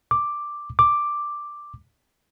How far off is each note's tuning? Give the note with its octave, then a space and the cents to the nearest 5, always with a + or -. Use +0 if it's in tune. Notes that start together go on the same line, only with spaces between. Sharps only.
D6 +5
D6 +5